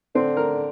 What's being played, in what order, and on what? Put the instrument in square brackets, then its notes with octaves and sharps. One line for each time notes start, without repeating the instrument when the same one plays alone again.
[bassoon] D3 [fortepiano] C4
[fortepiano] A#4